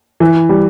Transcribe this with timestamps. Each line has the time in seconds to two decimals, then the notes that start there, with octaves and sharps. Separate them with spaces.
0.20 E3
0.49 G3